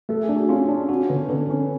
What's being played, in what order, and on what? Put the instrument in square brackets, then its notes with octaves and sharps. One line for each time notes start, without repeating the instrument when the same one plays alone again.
[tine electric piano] A3 [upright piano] A4
[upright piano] G#4
[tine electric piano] D4
[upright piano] F#4
[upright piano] C#4 [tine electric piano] F4
[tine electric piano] D4
[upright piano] C#4 [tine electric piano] F#4
[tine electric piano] D3 [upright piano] B3
[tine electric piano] D3 [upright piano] B3
[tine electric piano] D3 [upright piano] C#4